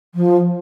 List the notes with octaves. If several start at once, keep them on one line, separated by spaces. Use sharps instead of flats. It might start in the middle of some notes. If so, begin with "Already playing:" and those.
F3